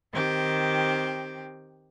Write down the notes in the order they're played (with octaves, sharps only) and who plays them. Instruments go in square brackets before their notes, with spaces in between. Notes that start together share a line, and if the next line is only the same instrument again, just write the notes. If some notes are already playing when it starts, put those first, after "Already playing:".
[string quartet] D#3 C4 G4